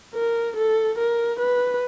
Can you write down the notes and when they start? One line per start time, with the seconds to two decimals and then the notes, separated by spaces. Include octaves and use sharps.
0.14 A#4
0.56 A4
0.98 A#4
1.40 B4